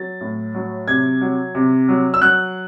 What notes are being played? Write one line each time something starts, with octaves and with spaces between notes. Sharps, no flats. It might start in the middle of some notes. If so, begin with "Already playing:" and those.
Already playing: F#3 A6
A2
F#3
C3 G#6
F#3
C3
F#3
E6
F#3 F#6